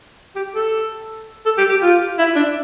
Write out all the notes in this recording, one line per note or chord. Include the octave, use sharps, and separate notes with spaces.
G4
A4
A4
G4
G4
F4
E4
D4